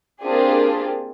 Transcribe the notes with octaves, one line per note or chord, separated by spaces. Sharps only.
A#3 C4 D4 F4 G4 G#4